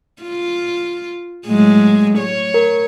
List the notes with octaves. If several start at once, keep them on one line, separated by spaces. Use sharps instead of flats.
F4
A2 F#3 G#3
C#5
A#4